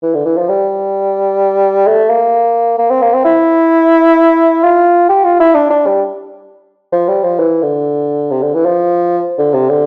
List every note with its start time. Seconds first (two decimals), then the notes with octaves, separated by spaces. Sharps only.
0.03 E3
0.14 D3
0.25 E3
0.37 F3
0.49 G3
1.87 A3
2.09 A#3
2.78 A#3
2.90 C4
3.02 A#3
3.13 C4
3.25 E4
4.63 F4
5.09 G4
5.25 F4
5.40 E4
5.55 D4
5.70 D4
5.86 G3
6.93 F3
7.08 G3
7.23 F3
7.39 E3
7.63 D3
8.31 C3
8.42 D3
8.54 E3
8.65 F3
9.38 D3
9.54 C3
9.69 D3